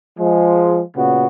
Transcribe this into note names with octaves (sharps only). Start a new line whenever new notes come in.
F3 G#3
A#2 C#3 B3 F#4